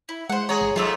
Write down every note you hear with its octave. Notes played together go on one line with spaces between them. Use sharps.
E4
G#3 C5 F#5
G#4 C#5 F#5 A#5
G1
G#2 F#3 A3 F4 C#5 E5